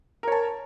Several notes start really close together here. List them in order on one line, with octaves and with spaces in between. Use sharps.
A#4 C#5 A5